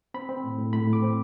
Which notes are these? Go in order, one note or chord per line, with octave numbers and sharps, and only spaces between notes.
C4 B5
C4
A2
A2
A2 B5
A2
D6
C4